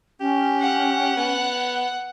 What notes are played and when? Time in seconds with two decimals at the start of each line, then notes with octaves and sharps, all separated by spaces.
0.21 C#4 G4
0.61 F#5
1.17 B3